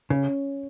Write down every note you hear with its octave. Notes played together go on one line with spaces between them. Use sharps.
C#3 C#4